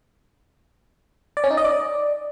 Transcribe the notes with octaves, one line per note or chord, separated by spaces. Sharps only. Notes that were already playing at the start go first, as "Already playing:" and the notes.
D5
C#4
D#4
D#5
D5